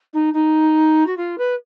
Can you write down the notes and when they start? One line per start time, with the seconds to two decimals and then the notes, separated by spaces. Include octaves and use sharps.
0.13 D#4
0.33 D#4
1.06 F#4
1.17 F4
1.38 B4